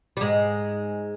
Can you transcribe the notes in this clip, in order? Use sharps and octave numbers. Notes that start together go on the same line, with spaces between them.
G3
G#2 G#3